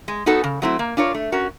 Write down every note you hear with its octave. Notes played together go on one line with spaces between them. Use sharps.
G#3
B3 D#4 F#4 A4
C#3
F#3 A3 C4 E4
A#3
D4 F4 A#4 C#5
A3
C#4 F#4 A#4